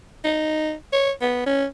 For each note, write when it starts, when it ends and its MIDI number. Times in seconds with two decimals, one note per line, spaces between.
0.24 0.74 63
0.93 1.11 73
1.21 1.42 59
1.46 1.65 61